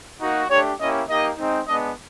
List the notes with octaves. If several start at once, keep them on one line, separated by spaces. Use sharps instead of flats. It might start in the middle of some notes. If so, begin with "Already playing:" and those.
A#3 D#4 F#4
A3 D4 G4 C#5
A#3 C#4 E4 G4 D#5
A#3 D#4 G4 D#5
G#3 C4 D#4
G#3 B3 D4 D#5